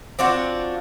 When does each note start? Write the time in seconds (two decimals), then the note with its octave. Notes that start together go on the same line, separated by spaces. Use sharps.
0.19 C4 D4 F4 F#4